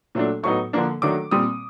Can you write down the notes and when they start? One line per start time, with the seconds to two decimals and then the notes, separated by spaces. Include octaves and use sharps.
0.15 A#2 F#3 A3 D4
0.43 A2 F#3 B3 D#4 C#6
0.73 D3 F3 A#3 D4
1.02 D#3 F#3 A3 D4 D6
1.31 A#2 G3 C4 D#6